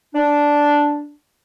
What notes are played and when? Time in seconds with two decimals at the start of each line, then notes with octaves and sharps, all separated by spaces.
0.14 D4